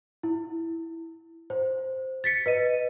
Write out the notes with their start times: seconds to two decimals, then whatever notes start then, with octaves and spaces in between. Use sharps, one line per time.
0.23 E4
1.50 C5
2.24 A6 B6 C#7
2.46 B4 D#5 D#7